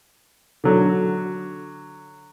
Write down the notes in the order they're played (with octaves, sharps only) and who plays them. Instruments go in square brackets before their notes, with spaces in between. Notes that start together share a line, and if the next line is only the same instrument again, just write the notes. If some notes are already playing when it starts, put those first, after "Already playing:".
[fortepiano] D3 F#3